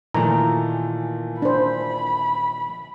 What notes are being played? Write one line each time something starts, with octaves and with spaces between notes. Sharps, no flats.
A#2 D#3 E3 A3 F4 A#5
D4 C5 B5